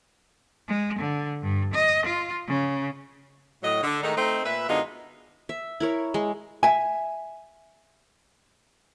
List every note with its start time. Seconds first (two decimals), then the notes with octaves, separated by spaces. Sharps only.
0.68 G#3
0.99 D3
1.43 G2
1.74 D#5
2.06 F4
2.48 C#3
3.63 A2 F#3 D#5
3.83 D3
4.03 A2 D#3 G#3 A3 D#4
4.17 A3 C4 D#4
4.44 A#2 B4 E5
4.68 F#2 D3 G#3 B3 D#4 F4
5.49 E5
5.80 E4 A#4 C#5
6.14 G#3
6.63 E5 G#5